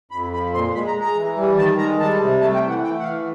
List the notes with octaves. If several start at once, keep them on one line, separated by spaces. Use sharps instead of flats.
F2 B5
F3 B5
A#2 C6
G#3 B5
A#5
G#3
A#5
E3
G3
D#3 A5
G#3 A#5
G3 A5
C3
A3 A5
G5
E3
F#5
A3 G5
F#5
E3 F5